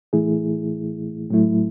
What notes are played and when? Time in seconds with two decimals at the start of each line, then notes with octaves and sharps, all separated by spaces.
0.13 A2 E3 A3 E4 G#4
1.30 A2 F#3 A3 E4